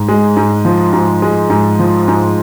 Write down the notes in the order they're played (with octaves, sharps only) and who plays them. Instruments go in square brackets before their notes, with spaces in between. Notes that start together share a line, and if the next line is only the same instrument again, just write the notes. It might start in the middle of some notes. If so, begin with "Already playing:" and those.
Already playing: [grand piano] G#2
G#3
G#2
F3
G#2
G#3
G#2
F3
G#2